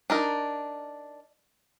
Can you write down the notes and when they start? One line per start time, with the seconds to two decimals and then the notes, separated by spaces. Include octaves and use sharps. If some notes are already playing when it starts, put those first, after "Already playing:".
0.10 D4 D#4 A#4